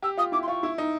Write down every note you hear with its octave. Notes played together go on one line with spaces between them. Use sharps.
G4 E6
F4 D#6
E4 D6
C6
F4 C#6
E4
D#4